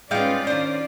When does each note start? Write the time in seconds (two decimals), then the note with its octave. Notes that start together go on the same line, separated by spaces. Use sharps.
0.11 G#3 B3 C#4 D#4 F4 D5 F5 G5
0.47 D#3 D4 C5